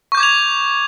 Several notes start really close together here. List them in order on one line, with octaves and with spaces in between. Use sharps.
C#6 G6 D6 G#6 F7